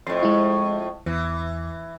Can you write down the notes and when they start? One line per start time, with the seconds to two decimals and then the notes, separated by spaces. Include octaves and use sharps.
0.07 F2 A2 C6
0.23 G#3 E4
1.06 E2 E3